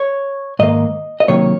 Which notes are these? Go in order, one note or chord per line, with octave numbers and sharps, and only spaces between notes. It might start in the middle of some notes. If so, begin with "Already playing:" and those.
Already playing: C#5
G#2 D#3 A#3 D#5
D#5
C3 D#3 F#3 A#3 C#5